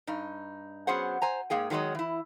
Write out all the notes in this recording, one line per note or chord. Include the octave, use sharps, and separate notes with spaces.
G2 D#4
F#3 B3 C#4 G#4 C5 F#5
C5 G#5 A#5
G#2 A#3 G#4 G5
D#3 F#3 G#3 C#5 D#5
E3 E4